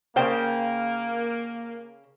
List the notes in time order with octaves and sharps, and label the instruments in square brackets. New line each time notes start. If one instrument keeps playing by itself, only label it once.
[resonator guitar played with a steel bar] C#3 C5 G5 [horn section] A#3